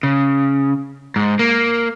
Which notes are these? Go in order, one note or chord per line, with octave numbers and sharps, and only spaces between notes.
C#3
G#2
A#3